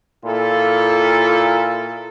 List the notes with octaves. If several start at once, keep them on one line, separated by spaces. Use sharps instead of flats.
A#2 E4 F4 A4